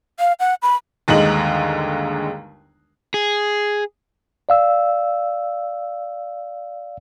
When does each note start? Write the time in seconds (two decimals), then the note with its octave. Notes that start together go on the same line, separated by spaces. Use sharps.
0.19 F5
0.40 F#5
0.62 B5
1.08 G1 D#2 D3 G#3 D#4 F#7
3.14 G#4
4.49 D5 F5 E6